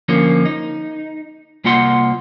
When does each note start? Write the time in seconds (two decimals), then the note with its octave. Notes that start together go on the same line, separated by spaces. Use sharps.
0.08 D3 F3 A#3 C#4
0.45 D#4
1.64 C2 A#3 F4 F#5 C6